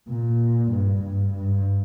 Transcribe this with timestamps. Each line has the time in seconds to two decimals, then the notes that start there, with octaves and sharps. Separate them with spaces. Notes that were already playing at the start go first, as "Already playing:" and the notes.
0.09 A#2
0.71 G2
1.02 G2
1.34 G2